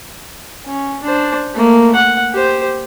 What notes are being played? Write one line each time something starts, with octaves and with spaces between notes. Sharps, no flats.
C#4
D4 C5
A3 A#3
F#5
G4 C5